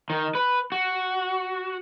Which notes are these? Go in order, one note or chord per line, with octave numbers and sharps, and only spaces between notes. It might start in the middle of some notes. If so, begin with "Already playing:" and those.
D#3
B4
F#4